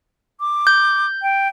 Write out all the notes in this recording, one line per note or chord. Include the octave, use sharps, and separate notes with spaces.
D6
G6
G5